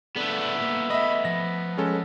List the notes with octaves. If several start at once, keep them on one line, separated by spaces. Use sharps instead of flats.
A3 B3 A4 D5
A#3 A#4
D#5 E5 B5
F3 A#6
G#3 C#4 A4